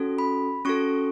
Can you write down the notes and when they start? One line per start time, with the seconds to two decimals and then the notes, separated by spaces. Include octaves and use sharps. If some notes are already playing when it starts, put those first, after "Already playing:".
Already playing: C#4 F#4 A4
0.18 B5
0.65 C#4 F#4 A4 C#6